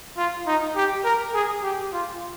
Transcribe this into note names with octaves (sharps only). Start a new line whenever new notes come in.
F4
D#4
G4
A#4
G#4
G4
F4